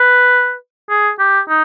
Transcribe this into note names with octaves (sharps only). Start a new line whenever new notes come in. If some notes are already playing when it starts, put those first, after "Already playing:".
Already playing: B4
G#4
G4
D#4